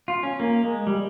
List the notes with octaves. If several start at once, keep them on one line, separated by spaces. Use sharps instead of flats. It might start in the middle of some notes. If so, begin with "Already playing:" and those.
F4
C#4
A#3
G#3
G3